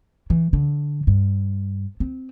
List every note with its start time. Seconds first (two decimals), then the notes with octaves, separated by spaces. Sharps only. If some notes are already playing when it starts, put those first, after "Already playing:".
0.30 E3
0.53 D3
1.07 G2
2.00 C4